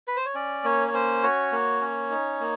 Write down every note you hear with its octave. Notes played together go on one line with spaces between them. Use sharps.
B4
C5
C#5
C#4 D5
A#3 C#5
C#5
C#4 C5
F#4 C#5
A#3
C#4
D#4
A#3